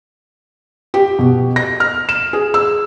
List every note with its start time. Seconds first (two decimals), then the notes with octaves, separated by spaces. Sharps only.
0.94 G4
1.19 B2
1.56 A#6
1.80 F6
2.09 E7
2.33 G#4
2.54 E6